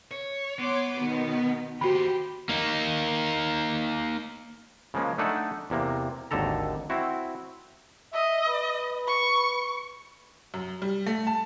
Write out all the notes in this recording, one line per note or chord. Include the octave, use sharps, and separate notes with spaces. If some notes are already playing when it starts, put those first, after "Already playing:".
C#5
B3 C#5 C6 D6
B2 D#3
D#2 F#4 G4 C5 B5
A#3 D#4
C#3 F3 G#3 A#3 C#4
A3 D4 D#4 A4 F#5 G#5
E2 C3 A#3
G#1 D#2 D3 A4 A#5
C4 E4 F#4
D#5 E5
B4
C#6
F#2
G3
A3
A5